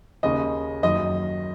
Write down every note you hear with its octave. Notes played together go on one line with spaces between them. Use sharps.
D#2 C#3 D#5
F#1 F#2 D#3 D#5